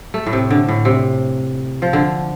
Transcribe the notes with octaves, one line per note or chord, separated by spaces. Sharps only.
A3
A2
C3
D3
A2
C3
F3
D3